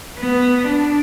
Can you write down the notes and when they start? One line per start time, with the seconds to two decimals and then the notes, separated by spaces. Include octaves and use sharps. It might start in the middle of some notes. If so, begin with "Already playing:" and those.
0.19 B3
0.68 D4